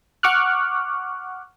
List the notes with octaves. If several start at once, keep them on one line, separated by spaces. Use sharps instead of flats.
F#5 C#6 D6 F6 F#6